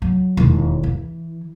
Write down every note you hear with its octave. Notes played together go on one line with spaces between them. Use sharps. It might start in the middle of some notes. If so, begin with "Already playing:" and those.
F#3
E1 D#2
E3